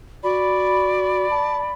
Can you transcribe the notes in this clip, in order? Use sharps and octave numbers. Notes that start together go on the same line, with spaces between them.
F#4 D5 B5
A5